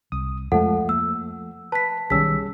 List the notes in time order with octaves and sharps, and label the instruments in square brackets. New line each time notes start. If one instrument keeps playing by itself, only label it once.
[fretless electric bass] C2 [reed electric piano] D#6
[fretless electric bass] F2 G#3 [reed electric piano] F3 A3 [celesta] A4 F#5
[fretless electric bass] A#3 [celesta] E6
[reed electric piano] B4 [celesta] A5 B6
[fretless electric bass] B1 D#3 [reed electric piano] G3 C#4 G#4 [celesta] E6 B6